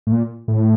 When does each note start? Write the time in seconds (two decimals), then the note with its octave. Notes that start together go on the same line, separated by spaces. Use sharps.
0.07 A2
0.12 A#2
0.48 A2